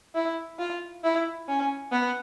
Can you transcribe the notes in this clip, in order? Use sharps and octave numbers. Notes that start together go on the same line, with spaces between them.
E4
F4
E4
C#4
B3